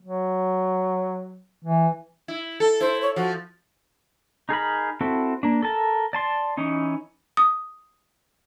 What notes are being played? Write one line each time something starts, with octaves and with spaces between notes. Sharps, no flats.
F#3
E3
E4
A4
E4 C5
C#5
F3 F#4
D#4 G#4 A#4 B5
C4 E4 F#4 A4
A#3 D4
A4 A#4 A5
D5 A5 C6
E3 C#4 D#4
D#6